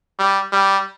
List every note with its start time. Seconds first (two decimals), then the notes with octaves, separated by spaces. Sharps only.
0.19 G3
0.52 G3